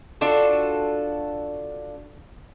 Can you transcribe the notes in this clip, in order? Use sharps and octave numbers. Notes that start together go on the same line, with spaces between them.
D4 F4 F#4 A4